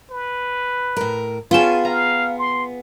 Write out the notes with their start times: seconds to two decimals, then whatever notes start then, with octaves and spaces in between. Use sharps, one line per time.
0.10 B4
0.97 A2 A#4
1.51 B3 C#4 F4 G#4 G5 A5
1.85 F5 A#5
2.38 C6